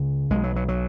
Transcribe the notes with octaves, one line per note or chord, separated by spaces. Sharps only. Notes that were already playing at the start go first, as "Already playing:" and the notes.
Already playing: C#2 C#3
B1 B2 G#3
F#3
F#3
F#3